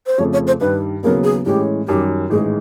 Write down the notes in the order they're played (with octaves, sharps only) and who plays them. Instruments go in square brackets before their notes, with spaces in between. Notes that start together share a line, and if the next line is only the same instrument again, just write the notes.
[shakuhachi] C5
[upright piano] F2 C#3 F3 A3 [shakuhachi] C#5
[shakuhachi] C#5
C5
[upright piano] G2 D#3 G3 [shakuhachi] B4
[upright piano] D#2 C#3 F#3 B3 [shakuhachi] A#4
[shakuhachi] G#4
[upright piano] A2 E3 G#3 C#4 [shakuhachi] G4
[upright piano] F#2 D#3 G3 [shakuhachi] G4
[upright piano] A1 G#2 D#3 G#3 [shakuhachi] G#4